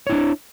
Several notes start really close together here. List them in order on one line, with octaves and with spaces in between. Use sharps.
C#5 E4 D4